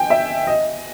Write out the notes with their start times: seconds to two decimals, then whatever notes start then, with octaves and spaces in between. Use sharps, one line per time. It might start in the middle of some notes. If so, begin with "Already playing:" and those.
Already playing: G5 G#5
0.10 E5
0.47 D#5